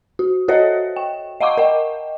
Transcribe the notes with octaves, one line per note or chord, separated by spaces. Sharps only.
F#4
F#4 A4 C5 C#5 D#5 E5
G5
D#5 F5 F#5 A#5 C#6 D6
A#4 D#5 G5